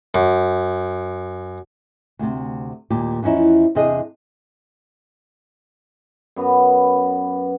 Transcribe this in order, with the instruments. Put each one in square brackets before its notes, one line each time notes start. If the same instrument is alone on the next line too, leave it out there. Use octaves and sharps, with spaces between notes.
[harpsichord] F#2
[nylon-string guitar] D2 C3
D#2 A#2 G4
E2 F3 C#4 D#4 E4
E2 C3 D4 G#4 D#5
[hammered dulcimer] F#2 B3 B4